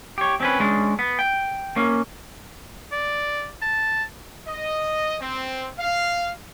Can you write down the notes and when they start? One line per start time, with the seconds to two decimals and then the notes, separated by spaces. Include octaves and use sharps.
0.18 G4 C#5
0.40 C4 C#4 B4
0.60 G#3 C#4 D4
0.99 B3
1.19 G5
1.76 A#3 C#4
2.92 D5
3.62 A5
4.46 D#5
5.21 C4
5.79 F5